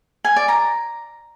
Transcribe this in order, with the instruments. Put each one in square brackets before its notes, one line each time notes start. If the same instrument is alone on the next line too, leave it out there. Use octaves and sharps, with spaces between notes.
[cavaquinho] G#5
D5
A#5